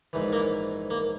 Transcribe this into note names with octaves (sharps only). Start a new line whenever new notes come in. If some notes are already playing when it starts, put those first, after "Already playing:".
A#1 G#2 E3
A#3 A#4
A#3